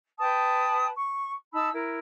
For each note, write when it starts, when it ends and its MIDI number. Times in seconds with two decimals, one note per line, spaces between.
0.19 0.87 71
0.19 0.87 79
0.19 0.87 81
0.19 0.87 87
0.96 1.32 85
1.53 1.69 63
1.53 1.69 81
1.53 1.69 83
1.53 1.69 88
1.72 1.99 64
1.72 1.99 70